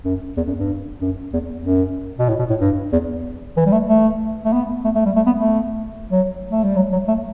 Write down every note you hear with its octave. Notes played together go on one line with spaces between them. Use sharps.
F#2
E2
F#2
G2
F#2
E2
F#2
B2
A2
B2
A2
G2
E2
E3
G3
A3
A3
A3
B3
A3
A3
G3
A3
B3
A3
F#3
A3
G3
F#3
F#3
A3